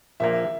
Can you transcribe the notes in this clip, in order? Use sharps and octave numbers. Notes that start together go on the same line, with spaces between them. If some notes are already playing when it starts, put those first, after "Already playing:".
A#1 A#2 A#3 E5